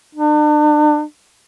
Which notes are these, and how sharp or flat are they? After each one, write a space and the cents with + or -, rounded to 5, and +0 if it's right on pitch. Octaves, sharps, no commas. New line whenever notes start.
D4 +40